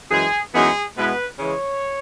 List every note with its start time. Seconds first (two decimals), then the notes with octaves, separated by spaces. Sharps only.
0.11 F#2 E3 G#3 G#4
0.54 F#2 E3 G#3 B3 D#4 G#4
0.97 B2 G#3 B3 E4 B4
1.39 C#3 E3 G#3 C#5